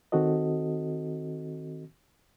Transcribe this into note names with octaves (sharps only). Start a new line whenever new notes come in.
D#3 C4 F#4 A4 D#5